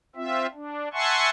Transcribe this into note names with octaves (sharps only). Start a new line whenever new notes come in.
C4 F4 E5
D4
E5 F#5 G#5 A5 C6 C#6